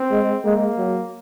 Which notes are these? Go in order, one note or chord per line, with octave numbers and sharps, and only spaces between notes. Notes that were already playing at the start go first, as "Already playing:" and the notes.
Already playing: C4
G#3
G#3 A#3
F#3